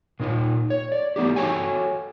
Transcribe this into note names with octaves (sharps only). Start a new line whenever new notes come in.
A#2 D#4 F4
C#5
D5
A3 B3 D#4 G4
F#4 A4 C#5 G5 G#5